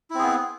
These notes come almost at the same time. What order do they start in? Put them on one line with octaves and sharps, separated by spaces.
E4 C4 G#4 B3